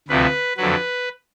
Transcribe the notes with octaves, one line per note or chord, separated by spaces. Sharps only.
D2 C3 F3 B4
F2 D3 F#3 B4